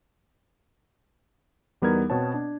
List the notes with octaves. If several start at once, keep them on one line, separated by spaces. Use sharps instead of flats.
E2 G3 B3 D#4 A#4 G#6
B2 B3 C4 C#5 A5
D4